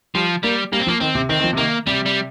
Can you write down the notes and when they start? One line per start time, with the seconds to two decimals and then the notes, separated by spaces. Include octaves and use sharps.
0.15 F3 G3
0.43 G3 A#3
0.72 G3 A#3
0.80 C4
0.87 F3 A#3
1.00 D#3 C4
1.15 C3
1.29 D#3 C4
1.40 D#3
1.44 F3
1.53 C3
1.57 D#3 A#3
1.87 C3 G3
2.06 G3